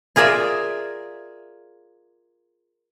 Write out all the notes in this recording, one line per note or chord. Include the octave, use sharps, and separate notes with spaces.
F4 G#4 A#4 D5 E5